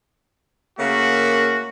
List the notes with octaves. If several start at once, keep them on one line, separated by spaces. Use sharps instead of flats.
C#3 A3 A#3 F#4